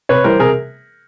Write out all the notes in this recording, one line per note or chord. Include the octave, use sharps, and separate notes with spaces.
C3 B4 C#5
E3 G3 A#4 C5
C3 G#4 A#4